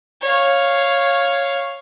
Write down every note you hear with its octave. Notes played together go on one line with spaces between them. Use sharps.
C#5 F5